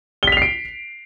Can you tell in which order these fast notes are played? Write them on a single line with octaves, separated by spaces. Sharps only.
G7 B6 F7 C7 D7